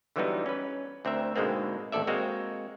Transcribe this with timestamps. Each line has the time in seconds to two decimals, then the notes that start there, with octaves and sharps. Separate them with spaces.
0.16 D3 E3 F#3 G3 B3 D#4
0.46 C#4 B4
1.05 D2 C4 A#4 E5
1.36 G#2 B2 D3 G#3 A#3 C4
1.92 A1 D#2 A4 D5 E5
2.07 G#3 A#3 C4 F#4